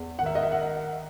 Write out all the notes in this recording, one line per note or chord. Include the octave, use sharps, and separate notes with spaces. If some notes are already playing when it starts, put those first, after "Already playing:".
Already playing: E2
D#3 F#5
E5
D#5
E5
F#5